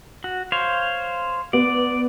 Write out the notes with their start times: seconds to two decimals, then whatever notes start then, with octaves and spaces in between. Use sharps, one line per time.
0.24 F#4
0.52 C5 C#5 F5
1.53 B3 D5